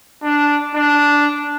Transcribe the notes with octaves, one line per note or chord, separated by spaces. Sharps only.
D4
D4